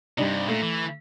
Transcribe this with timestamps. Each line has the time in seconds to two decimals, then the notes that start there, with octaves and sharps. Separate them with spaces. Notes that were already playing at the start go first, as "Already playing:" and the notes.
0.18 G2 C3 G3 D4 D#4
0.48 A#2 A3
0.62 E3